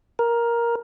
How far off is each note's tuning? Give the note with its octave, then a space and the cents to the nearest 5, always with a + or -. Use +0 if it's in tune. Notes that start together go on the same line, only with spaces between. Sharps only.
A#4 +10